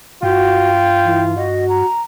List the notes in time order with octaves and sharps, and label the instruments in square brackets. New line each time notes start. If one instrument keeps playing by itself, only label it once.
[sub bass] G2 [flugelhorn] F4 [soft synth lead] F#4 [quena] G5
[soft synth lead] E3
[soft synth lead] F#4 [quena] D#5
[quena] A#5